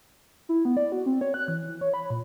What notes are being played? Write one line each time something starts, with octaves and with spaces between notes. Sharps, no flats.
E4
B3
D5
F#4
C4
C#5
F#6
E3
E3
C#5
B5
A#2